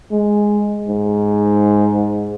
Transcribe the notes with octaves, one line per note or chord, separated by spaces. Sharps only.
G#3
G#2